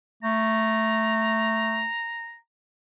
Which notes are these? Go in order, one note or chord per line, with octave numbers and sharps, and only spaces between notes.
A3 A#5